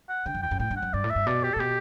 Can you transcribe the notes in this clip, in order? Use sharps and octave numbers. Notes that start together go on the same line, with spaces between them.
F#5
D3 G5
F#2
E2 G5
F#2
A2 G5
G2
F#5
F#2
G2 D5
A2
E5
G2
B2 D5
G4
A2 A4
B2 G4